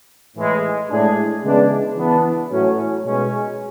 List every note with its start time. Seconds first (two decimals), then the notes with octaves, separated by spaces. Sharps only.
0.35 A2 E3 G#3
0.89 A2 G#3 D4 G#4
1.44 C#3 E3 G#3 B3 D4
1.97 E3 B3 D4
2.51 A2 F#3 C#4
3.05 B2 G#3 C#4